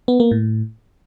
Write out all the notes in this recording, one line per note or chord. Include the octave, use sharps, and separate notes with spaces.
B3
A#3
A2